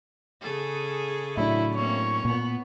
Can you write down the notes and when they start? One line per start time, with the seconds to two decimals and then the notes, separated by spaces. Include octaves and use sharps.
0.42 C#3 G#4 A4
1.37 A2 F#3 D4 E4
1.75 A#3 C4 C#4 C#5
2.25 A#2 B3